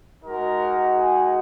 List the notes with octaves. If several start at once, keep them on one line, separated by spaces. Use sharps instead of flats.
G#3 D#4 F#4 A#4
G#4